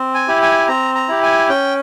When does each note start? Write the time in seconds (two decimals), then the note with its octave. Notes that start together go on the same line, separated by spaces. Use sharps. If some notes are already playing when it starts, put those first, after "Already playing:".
Already playing: C4
0.14 G#5
0.28 E4 G4
0.42 G#5
0.68 C4 A#5
0.95 A#5
1.09 E4 G4
1.23 G#5
1.49 C#4 G5